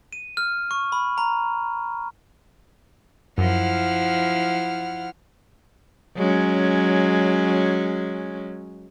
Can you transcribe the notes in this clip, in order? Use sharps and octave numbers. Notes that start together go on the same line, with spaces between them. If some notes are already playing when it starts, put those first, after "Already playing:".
D#7
F6
C#6
B5
A#5
F#2 F3 E4 F#5 F6
F#3 G#3 C#4